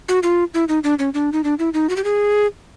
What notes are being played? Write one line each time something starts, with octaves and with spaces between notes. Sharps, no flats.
F#4
F4
E4
D#4
D4
C#4
D4
D#4
D4
E4
D#4
F#4
G4
G#4